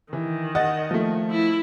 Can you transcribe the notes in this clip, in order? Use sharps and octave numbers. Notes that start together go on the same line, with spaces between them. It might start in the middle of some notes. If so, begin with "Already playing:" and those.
D#3 E3
D#5 F#5 A6
F3 A3
E4